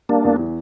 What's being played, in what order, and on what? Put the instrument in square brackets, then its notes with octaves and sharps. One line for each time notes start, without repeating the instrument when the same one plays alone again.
[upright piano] G3 [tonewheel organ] A#3 D4
[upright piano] E2
E3